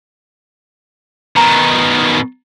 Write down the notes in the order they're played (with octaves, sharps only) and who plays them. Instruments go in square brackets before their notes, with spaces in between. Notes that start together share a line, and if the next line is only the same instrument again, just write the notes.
[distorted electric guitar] B2 D#3 [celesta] A#5